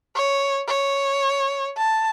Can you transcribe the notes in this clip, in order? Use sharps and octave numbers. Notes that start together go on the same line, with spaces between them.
C#5
C#5
A5